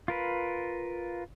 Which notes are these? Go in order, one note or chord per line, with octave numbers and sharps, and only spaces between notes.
F4 A#4 B4